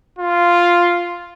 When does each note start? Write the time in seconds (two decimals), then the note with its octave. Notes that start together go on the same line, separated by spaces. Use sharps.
0.19 F4